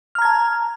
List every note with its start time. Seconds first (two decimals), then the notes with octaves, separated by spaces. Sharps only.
0.15 F6
0.19 A#5
0.22 G#6
0.25 A5